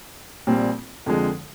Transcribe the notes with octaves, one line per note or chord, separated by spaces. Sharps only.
A#1 A#2 G3 C4
F2 D3 F3 G#3